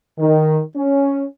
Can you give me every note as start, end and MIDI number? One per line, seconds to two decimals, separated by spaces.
0.19 0.60 51
0.76 1.25 61